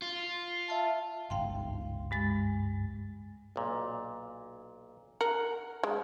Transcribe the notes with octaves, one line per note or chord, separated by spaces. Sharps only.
F4
E5 F5 A5
G1 C#2 G#2 F5 G5 C6
G2 G#3 A6
B1 A#2
A#4 F#5
G#3